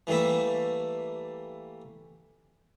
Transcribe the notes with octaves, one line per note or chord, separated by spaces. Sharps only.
E3 G3 A3 A#3 E5